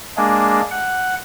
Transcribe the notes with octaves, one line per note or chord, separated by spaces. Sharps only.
G#3 A#3 D4 G#4
F#5